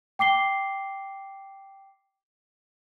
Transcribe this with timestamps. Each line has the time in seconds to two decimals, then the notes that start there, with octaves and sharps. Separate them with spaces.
0.19 G5 D6 C7 G7